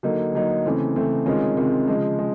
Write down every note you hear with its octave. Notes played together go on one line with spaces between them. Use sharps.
D3 F#3 A#3 D#4
D3 F#3 A#3 D#4
C#3 E3 A3 C4
C#3 E3 A3 C4
C3 D#3 G#3 C#4 F4
C3 D#3 G#3 C#4 F4
C#3 F3 G#3
G#3